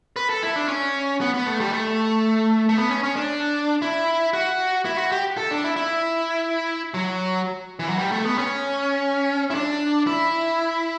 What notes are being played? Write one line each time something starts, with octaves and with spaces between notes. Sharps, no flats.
B4
A4
E4
D4
C#4
B3
B3
A3
G3
A3
A3
B3
C#4
C#4
D4
E4
F#4
E4
F#4
G4
A4
D4
E4
E4
F#3
E3
F#3
G3
A3
B3
C#4
E4
D4
E4